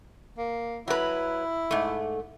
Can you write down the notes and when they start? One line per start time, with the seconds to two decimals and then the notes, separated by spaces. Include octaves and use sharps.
0.38 A#3
0.88 F#3 E4 B4
1.71 G#2 A3